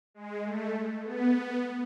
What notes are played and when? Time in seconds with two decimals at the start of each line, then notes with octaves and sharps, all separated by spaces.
0.14 G#3
0.44 A3
1.04 B3